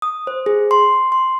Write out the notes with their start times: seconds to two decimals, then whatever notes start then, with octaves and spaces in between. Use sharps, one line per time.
0.02 D#6
0.27 C5
0.46 G#4
0.71 C6
1.12 C6